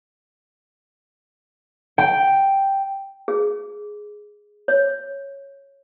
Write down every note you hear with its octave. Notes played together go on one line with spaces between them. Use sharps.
G5
G#4
C#5